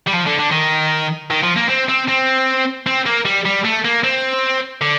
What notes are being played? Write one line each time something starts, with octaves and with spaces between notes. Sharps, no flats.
G3
F3
D3
D3
D#3
D#3
F3
A#3
C4
C4
C4
C4
A#3
G3
G3
A3
A#3
C4
D3